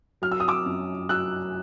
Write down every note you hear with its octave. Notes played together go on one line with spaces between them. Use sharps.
F#3 F6
E6
D#6
D6 E6
F#2
F#3 E6 F#6